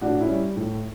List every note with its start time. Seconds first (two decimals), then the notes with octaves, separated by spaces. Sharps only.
0.01 A2 D4 F#4
0.20 C#4 E4
0.29 G3
0.56 A2